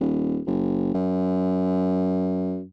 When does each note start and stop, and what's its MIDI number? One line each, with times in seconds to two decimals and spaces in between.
0.01 0.40 27
0.47 0.94 30
0.94 2.64 42